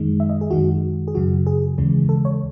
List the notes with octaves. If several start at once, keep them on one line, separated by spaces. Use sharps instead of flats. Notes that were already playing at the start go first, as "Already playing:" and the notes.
Already playing: F#2 D#3 G#3
E5
D#5
G#4
F#2 D#3 G#3 F#4
G#4
F#2 C#3 F#3 F#4
G#4
D#2 C#3 E3 G#3
A4
C#5